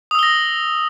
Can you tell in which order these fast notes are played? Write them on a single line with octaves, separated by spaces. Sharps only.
D#6 E6 G7 A#6